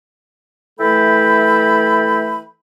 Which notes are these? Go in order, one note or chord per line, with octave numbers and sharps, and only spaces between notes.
E3 A3 A4 E5 G5 B5